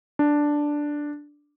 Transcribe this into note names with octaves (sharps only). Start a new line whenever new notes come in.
D4